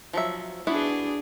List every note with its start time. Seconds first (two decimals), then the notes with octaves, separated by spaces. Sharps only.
0.13 F3 F#3 E5
0.67 B3 D4 E4 F#4 G#4